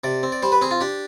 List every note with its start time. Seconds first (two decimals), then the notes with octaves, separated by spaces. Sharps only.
0.04 C3 D5
0.23 C4
0.32 D5
0.43 G3 C5
0.52 B4
0.61 C4 G#4
0.71 F4
0.81 D4 G4